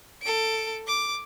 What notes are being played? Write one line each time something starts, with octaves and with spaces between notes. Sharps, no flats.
A4 D7
D6